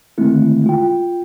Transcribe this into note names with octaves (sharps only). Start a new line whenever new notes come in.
D3 D#3 G#3 A3 C4 E4
F4 G5